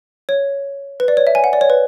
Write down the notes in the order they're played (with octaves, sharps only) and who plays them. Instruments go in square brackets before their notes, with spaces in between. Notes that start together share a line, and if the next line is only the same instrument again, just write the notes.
[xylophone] C#5
B4
D5
C#5
E5
G#5
F#5
D5
C#5
B4